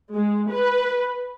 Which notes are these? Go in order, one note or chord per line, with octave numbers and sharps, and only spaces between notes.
G#3
B4